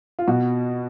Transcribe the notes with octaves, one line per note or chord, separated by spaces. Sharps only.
F4
B2 F#4